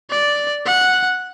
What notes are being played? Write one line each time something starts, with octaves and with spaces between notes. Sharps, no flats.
D5
F#5